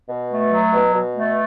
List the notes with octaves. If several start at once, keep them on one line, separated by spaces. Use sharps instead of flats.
B2
A3
F#3
B2
B2
A3